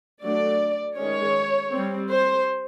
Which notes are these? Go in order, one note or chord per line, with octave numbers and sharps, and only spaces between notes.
F#3 A3 D4 D5
D#3 G#3 C#4 C#5
G3 C4
C5